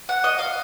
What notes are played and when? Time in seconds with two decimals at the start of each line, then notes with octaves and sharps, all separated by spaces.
0.09 F#5
0.24 D#5
0.39 F5